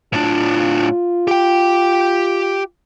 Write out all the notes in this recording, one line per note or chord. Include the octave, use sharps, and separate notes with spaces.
A2 D4 F4
G4 G5